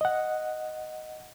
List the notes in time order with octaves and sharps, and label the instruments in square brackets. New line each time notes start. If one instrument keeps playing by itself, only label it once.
[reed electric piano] D#5 F#5